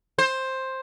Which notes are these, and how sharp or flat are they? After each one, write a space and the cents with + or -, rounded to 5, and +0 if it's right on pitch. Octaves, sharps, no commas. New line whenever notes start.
C5 +10